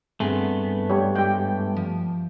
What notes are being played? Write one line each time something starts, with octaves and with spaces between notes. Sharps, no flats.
G2 A3 B3 C4 G#4 G#5
G3 G4 C#5
G#3 G4 G5
F3